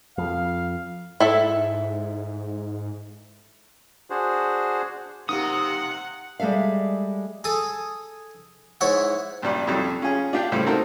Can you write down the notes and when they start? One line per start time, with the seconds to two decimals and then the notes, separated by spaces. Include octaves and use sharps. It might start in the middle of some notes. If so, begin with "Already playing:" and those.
0.18 F2 F5
1.20 G#2 E4 A4 E5
4.10 D4 F#4 G#4 C5
5.29 C3 A#3 D#4 G4 F#5 D#6
6.39 G3 G#3 A4 E5 F5
7.44 G#4 A4 D#6
8.81 G#2 E4 C#5 E5 F#5
9.42 A#1 G2 G3 D5
9.67 F2 F#3 G3
10.02 C#4 F4 G#4
10.33 D4 F4 G4 F5 G5
10.52 C#2 A2 G3 C5
10.66 C4 D#4 F#4 A4 A#4 C5